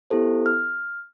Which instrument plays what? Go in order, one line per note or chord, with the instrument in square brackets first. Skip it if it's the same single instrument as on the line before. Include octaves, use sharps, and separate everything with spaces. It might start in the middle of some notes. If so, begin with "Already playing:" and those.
[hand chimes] B3 E4 G4 A4 C5
F6